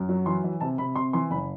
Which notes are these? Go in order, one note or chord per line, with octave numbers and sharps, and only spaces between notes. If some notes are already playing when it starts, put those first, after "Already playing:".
Already playing: F#2
F#3
E3 C6
E3
C3 A5
C3 B5
C3 C6
E3 C6
F#1 B5